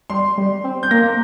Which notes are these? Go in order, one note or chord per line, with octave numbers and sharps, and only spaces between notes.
G3 C6
G3
C4
G6
A#3 A#6